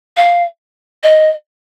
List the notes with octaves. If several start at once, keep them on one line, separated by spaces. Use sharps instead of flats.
F5
D#5